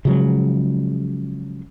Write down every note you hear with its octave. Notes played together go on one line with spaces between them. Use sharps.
C#3 F3 F#3 G#3